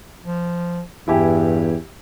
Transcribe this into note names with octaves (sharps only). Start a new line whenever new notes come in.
F3
E2 G2 E4 G4 G#5